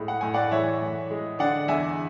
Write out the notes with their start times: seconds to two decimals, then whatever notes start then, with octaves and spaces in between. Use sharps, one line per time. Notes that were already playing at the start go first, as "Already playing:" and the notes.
Already playing: A2 G#3
0.08 F#5
0.21 A2 G#5
0.34 D5 F#5
0.51 E3 C#5 E5
0.81 A2
1.11 G#3
1.39 D3 D5 F#5
1.68 E2 E5 G#5